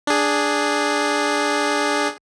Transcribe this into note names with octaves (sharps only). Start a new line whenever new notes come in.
D4 G#4